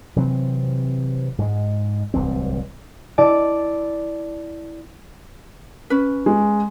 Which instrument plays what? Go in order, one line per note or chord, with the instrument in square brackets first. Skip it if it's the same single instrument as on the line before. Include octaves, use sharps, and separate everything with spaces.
[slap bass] C3 E3 F#3 C4
G#2 G#3
D1 C2 E3 C4
[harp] E4 D5 A5
[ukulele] C#4 B4
[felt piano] G#3